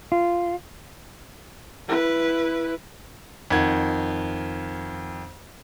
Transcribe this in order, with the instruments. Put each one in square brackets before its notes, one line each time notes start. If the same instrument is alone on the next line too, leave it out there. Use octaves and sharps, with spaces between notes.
[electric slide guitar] F4
[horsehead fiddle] E4 B4
[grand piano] F2 D#3 F#5 G#6